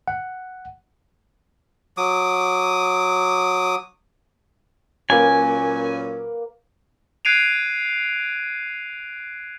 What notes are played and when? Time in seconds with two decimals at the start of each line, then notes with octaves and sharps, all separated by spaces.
0.08 F#5
1.97 F#3 D6 D#6
5.10 A#2 F#3 A#3 C#4 B4 G#5 D6
7.25 F#6 G#6 C7 D7 D#7 F7